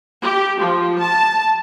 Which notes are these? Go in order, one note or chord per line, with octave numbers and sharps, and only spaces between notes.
G4
F3
A5